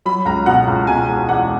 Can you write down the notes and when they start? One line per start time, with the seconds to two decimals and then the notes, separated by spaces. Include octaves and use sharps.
0.05 F#3 B5
0.25 C#2 A#5
0.46 B2 F#5
0.68 C#2
0.87 B2 G#5
1.09 E1
1.29 E2 F#5